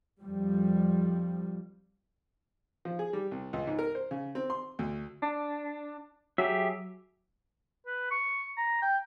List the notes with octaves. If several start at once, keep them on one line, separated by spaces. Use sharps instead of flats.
F2 F3 G3
F3
G#4
G3
C2
C#2
G#2
A#4
C5
C#3
C4
C6
D2
D4
F#3 G4 G#4 E5
B4
C#6
A#5
G5